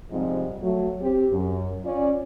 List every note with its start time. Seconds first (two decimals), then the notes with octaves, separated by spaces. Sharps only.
0.10 F2 G#2 C3 F3 G3 C4
0.62 F#3 A3
1.01 C4 G4
1.32 F#2
1.84 C#4 F4 D5